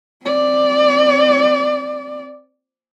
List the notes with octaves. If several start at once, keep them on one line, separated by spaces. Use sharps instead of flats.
C4 D5